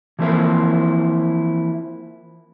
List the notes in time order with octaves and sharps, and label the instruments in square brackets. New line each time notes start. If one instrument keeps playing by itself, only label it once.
[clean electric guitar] E3 F3 A#3 C4 E4